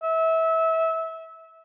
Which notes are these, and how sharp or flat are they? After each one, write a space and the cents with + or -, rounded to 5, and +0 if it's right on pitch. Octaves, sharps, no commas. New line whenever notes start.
E5 -25